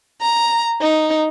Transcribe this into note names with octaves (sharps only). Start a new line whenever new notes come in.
A#5
D#4